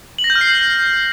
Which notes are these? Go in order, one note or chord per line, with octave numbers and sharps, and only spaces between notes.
F#7
A#6
G6
F6
C7